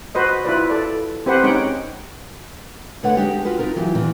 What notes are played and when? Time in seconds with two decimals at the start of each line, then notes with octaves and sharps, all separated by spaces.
0.15 F#4 B4 C5 D#5
0.44 E4 F4 B4 D5
0.70 A4 D5
1.26 C4 G4 B4 C5 F#5
1.43 G#3 C#4 D#4 C#5 F#5 G5
3.03 D3 A3 B4 C#5 F#5
3.17 G#3 D4 D#4 G4
3.45 F4 F#4 B4
3.59 D#4 F4 A#4
3.76 E3 F#3 F4 G4
3.95 A#2 D#3 E3